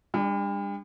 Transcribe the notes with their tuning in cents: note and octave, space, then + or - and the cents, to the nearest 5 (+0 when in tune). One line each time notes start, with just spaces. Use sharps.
G3 +40 D4 +5